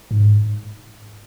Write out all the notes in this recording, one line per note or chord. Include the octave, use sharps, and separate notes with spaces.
G#2